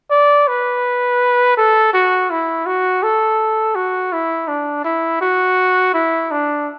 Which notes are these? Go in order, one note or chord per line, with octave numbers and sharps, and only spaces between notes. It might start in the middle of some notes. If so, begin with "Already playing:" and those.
D5
B4
A4
F#4
E4
F#4
A4
F#4
E4
D4
E4
F#4
E4
D4